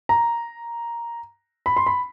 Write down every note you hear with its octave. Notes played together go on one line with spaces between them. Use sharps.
A#5
B5
C6
B5